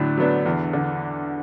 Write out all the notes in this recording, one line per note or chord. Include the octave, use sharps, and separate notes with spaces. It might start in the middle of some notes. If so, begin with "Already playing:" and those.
Already playing: A2 D3 F#3 D4
F#3 B3 D4
E2
D3